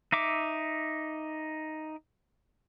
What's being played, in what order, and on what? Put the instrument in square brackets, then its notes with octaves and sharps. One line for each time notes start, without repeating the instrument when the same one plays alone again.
[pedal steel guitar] D#4 E5 D6